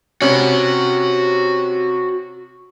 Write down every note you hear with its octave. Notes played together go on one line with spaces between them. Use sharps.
C3 C#4 F#4 B5